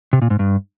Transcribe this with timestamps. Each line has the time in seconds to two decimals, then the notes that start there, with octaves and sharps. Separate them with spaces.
0.13 C3
0.22 A#2
0.30 G#2
0.39 G2